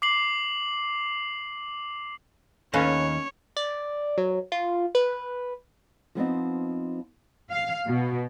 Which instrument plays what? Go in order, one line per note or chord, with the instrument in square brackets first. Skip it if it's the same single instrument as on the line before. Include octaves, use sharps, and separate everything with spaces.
[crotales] D6 C7 F#7
[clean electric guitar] D#2 [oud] C#4 [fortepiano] A4 B4 F5 [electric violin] C#5
[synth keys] D5
F#3
F4
B4
[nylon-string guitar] F3 B3 C4 D#4
[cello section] F5
B2